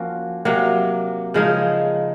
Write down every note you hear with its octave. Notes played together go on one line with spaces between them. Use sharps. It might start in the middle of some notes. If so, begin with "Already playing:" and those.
Already playing: F3 A#3 C#4 F#4
C3 F#3 A#3
C#3 F3 G#3 D#4